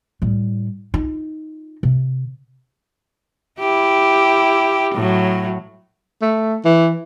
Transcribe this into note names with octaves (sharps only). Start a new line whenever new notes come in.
A2 G3
D#4 F4
C3
E4 G4
A2 F#3
A3
E3